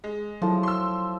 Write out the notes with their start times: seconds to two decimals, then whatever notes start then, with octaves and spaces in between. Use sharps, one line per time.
0.04 G#3
0.42 F3 F#3 E4 A4
0.63 C6 E6